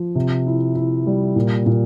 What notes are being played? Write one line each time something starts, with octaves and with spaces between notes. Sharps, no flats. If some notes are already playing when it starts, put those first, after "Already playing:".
Already playing: F3
C3
E4
E4
G3
A#2
A#2